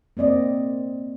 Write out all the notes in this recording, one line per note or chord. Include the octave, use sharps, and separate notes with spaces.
A#3 C4 D5 D#5